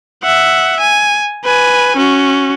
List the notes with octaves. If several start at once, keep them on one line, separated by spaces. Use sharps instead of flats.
E5 F#5
G#5
B4 G#5
C#4 F#4